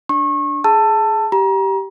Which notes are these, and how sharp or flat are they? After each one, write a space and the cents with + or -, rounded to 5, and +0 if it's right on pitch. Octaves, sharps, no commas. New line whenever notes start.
D4 +0 C#6 -30
G#4 +10 A5 +15 E6 +20
G4 -10 A#5 +30